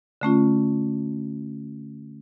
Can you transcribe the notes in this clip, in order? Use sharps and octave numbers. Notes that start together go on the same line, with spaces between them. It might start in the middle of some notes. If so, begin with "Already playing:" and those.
D3 A3 C#4 F4